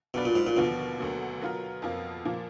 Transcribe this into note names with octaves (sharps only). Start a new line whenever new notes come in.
B2 F#3 D4 F4 B4 D5
A#2
G#2
A#2
D#2 B2 D3 F3 B3 F4
D2 D3 F#3 A#3
F#3 B3 F4 A#4
F2 F3 A#3 F4
A#2 F3 A#3